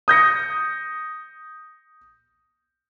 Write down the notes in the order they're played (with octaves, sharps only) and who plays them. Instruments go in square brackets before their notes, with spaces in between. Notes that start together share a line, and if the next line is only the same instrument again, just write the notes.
[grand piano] D#6 G6 A#6 C#7